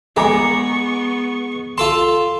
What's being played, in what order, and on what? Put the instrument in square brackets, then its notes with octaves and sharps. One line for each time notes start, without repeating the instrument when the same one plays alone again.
[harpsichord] G#3 [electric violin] B3 C#6 [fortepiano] G#4 A#5 D6
[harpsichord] F4 A4 A5 [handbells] C6